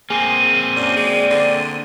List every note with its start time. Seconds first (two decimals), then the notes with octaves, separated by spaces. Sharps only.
0.10 A#3 C4 G#4 D#7
0.76 F#2 D5
0.96 G#3
1.30 D3